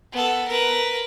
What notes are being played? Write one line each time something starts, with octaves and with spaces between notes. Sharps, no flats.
B3 A4
A#4 B4